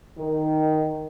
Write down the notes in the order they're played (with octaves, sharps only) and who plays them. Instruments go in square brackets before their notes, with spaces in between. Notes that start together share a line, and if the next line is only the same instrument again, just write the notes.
[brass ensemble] D#3